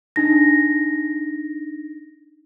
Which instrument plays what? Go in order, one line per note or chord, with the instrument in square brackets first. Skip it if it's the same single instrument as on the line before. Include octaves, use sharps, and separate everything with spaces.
[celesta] D4 D#4 A#6